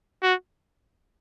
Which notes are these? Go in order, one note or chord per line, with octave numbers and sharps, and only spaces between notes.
F#4